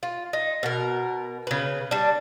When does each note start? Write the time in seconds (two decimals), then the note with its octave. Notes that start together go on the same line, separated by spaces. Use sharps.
0.03 F4
0.33 D#4
0.63 B2 A#4
1.47 C#3 B4
1.91 G3 D4